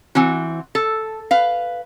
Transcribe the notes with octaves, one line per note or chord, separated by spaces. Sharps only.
E3 C4 F#4
A4
B4 F5